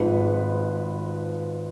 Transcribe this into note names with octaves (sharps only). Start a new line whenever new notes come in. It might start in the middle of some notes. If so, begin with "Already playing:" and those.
Already playing: G#1 G#2 F3 B4